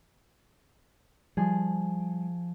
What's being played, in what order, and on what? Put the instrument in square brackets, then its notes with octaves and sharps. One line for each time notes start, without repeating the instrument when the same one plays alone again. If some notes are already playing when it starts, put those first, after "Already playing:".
[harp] F3 G#4 [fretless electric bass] G3